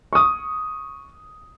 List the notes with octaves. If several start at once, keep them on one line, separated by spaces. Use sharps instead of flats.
C#6 D#6